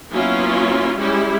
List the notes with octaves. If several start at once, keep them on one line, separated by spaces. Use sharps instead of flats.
F#3 A#3 B3 C#4 E4 F4
G3 G#3 C#4 E4 G4